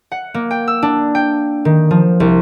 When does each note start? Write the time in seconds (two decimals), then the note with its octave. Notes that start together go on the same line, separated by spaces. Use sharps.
0.12 F#5
0.34 A#3
0.51 G5
0.68 E6
0.83 D4
1.15 G5
1.65 D#3
1.91 F3
2.20 C2